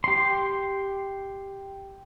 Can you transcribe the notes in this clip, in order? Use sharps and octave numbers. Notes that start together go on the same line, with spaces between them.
G4 C6